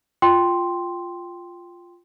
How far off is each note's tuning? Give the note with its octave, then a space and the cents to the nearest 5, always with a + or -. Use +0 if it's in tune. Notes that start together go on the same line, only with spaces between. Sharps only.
F4 +0 G5 +0 C6 +0